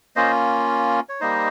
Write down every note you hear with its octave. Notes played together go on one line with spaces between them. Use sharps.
A#3 C#4 F4 C5 D#5
C#5
G3 A#3 D#4 C5 D#5